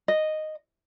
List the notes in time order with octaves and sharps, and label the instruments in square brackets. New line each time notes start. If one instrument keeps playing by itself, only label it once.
[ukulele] D#5